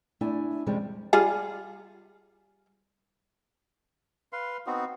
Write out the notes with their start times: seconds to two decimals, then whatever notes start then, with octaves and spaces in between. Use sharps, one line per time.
0.21 A3 D4 E4 G#5
0.66 F2 C3 E3 G3 G#3 C#4
1.13 G3 F4 G#4
4.33 B4 F5 C6
4.67 B3 C4 D#4 F#4